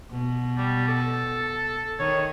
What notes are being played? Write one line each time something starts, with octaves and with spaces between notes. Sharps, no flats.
B2
G3
A4
D#3 C#5